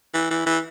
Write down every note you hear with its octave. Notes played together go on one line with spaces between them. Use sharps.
E3
E3
E3